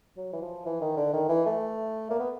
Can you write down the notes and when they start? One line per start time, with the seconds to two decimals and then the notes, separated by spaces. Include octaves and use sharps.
0.17 F#3
0.33 E3
0.42 F3
0.66 E3
0.81 D#3
0.97 D3
1.13 D#3
1.29 E3
1.46 A3
2.10 A#3
2.19 B3